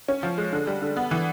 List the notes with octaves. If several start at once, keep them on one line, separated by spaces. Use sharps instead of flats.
C#4
F3
G#3
D3
G3
D3
B3
E3